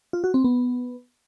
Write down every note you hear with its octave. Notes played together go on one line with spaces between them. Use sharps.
F4
F#4
C4
B3